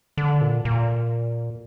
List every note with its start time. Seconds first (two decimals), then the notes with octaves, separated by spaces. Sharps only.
0.17 D3
0.41 A#2
0.65 A#2